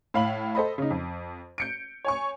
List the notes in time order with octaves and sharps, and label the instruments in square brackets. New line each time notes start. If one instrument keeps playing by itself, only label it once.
[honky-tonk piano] A2 F5 B5 F#7
A4 C5 D#5 B5
C#3 D#4
F2
G6 C#7 D7
C#5 G#5 C#6